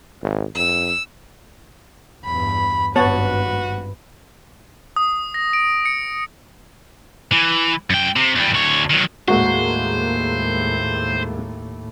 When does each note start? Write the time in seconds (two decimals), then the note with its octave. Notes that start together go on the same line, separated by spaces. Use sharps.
0.23 G#1
0.55 F2 E6
2.25 E2 G2 B5
2.96 G#1 G2 B3 F#4 B4 C#5 A5
4.96 D#6
5.34 A#6
5.53 D7
5.85 C#7
7.32 E3
7.90 F#2 G5
8.16 C3
8.36 E2 G3
8.54 D2 C#5
8.90 D#3 F#3
9.28 D#2 A2 G#3 A#3 F#4 C5